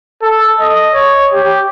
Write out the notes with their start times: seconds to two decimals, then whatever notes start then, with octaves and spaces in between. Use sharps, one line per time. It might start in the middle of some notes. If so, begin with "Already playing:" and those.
0.22 A4
0.60 D#5
0.94 C#5
1.33 G4